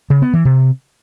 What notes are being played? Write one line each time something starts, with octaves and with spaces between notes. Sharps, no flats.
C#3
B3
E3
C3